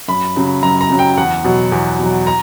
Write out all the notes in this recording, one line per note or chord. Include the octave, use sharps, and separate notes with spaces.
F#2 B5
C#3 F#3
F#2 A#5
A#5
C#3 F#3
G5
E2 F#5
B2 F#3
E2
B2 F#3
A#5